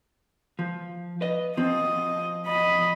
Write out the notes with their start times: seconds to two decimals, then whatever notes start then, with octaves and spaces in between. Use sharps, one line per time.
0.59 F3
1.21 B4 D#5
1.57 F3 C4 D#5
2.47 D#5 B5